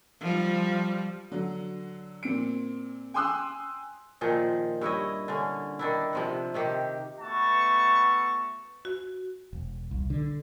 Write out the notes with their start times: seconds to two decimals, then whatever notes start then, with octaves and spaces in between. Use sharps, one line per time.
0.20 F3 G3
1.32 D3 F#3
2.23 A#2 C4 D7
3.14 G5 G#5 C6 D#6 E6 F#6
4.21 A#2 D#3 F3 G#4
4.81 G2 E4 C#5 D#5
5.28 D3 C#4
5.79 D#3 D4 E4
6.13 C3 F3 F#5
6.54 C3 D#3 G4
7.20 A3 B3 F#4 A5 C#6
8.85 F#4
9.53 E1
9.91 C2
10.10 D3